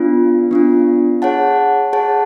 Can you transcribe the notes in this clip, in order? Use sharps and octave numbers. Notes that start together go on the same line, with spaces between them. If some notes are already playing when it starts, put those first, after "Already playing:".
Already playing: B3 D4 F4
B3 D4 F4
G#4 C#5 F#5 A5
G#4 C#5 F#5 A5